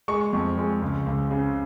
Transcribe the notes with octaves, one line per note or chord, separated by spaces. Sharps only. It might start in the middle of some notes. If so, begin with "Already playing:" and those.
G#3 C#6
F2
G#3
C#2
C#2
C#3